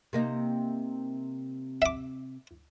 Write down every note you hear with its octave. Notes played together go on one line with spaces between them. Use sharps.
C3 A#3 D#4
E5 D6